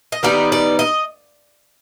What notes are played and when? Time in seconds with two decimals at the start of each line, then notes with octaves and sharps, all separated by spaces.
0.12 D#5
0.23 D#3 G3 B3 D#4 D5
0.52 D5
0.79 D#5